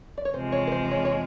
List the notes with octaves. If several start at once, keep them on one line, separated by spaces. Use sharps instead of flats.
D5
C#5
E2 C3 F3 G#3 C5
C#5
B4
C5
C#5
C#5